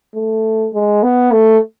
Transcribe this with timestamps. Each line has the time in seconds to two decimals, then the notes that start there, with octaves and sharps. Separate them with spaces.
0.15 A3
0.74 G#3
1.03 B3
1.32 A3